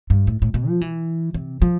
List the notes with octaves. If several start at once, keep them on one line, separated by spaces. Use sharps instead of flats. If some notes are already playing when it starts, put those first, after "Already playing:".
G2
A2
A2
B2
F3
E3
C3
F3